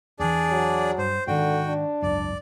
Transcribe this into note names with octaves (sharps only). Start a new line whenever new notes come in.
E2 E3 D4 G#4 D5
F#3
G2 C5
G#2 D3 D#3 F#4 G5
D4
G#1 C#2 F#2 D5